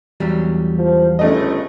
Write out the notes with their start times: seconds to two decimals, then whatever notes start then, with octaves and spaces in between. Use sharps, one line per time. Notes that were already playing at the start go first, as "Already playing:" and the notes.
0.20 E2 F#3 G3
0.78 F3
1.19 G1 C#3 A3 D#5